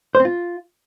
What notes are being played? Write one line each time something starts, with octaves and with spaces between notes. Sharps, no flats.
C5
C4
F4